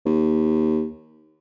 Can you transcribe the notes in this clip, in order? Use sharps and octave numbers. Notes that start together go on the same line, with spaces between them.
D#2